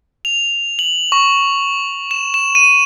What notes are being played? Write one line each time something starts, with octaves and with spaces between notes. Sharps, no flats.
F7
F#7
C#6
E7
E7
D#7